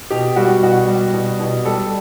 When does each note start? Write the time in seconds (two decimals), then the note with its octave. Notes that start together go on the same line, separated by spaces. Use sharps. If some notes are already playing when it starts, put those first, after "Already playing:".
0.10 B2 G4
0.36 G3 F#4
0.63 B2 F#4
0.88 G3
1.13 B2
1.40 B2
1.65 G3 A4